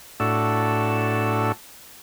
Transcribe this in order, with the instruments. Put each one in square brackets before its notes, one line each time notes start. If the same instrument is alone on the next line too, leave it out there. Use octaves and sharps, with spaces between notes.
[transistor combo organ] A2 D4 F#4 A4 E6